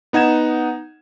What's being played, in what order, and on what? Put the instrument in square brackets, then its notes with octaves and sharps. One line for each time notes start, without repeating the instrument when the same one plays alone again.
[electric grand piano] B3 D#4 F#5 G#6 E7